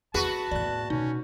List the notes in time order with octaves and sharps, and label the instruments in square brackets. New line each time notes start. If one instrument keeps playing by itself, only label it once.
[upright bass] E2 [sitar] F#4 B4 [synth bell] G#4 C#6 [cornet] A5
[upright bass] E2 A2 [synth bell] D5 F#6
[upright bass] B2 A3 [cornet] C#4 [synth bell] D#4